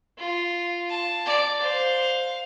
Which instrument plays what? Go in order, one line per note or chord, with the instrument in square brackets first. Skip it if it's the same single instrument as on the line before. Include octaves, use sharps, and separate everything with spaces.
[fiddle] F4
[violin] A5
[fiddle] D5
[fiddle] C5 [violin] F5